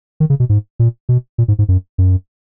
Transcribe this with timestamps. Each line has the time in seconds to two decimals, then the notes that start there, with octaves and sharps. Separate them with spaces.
0.20 D#3
0.30 C#3
0.40 B2
0.49 G#2
0.79 A#2
1.09 B2
1.38 A#2
1.48 G#2
1.59 G#2
1.68 F#2
1.98 F#2